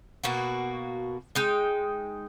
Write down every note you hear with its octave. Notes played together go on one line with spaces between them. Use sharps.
B2 A#3 F#4
G#3 D#4 G5